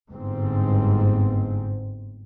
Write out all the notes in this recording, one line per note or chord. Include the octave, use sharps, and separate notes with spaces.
G1 G#2 C4